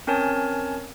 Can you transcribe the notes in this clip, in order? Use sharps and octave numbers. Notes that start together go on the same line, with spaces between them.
C4 C#4 A#4 C#5 G#5 A5